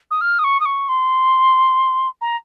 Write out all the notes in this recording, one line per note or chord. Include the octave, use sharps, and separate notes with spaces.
D#6
F6
D#6
C#6
D#6
C#6
C6
A#5